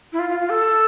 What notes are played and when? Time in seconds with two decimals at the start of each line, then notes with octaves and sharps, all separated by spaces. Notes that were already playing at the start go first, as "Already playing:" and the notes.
0.13 E4
0.19 F4
0.30 F4
0.40 F4
0.50 A4